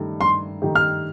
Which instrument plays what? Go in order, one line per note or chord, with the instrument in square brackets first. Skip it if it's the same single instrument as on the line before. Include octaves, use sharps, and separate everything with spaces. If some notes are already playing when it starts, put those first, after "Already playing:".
Already playing: [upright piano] G2 D#3 A3 D#4 G4
[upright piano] G2 [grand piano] C6
[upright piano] D#3 A3 D#4 G4
[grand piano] F6